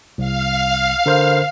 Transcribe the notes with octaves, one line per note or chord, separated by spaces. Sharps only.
C2 F5
D3 A#4 C5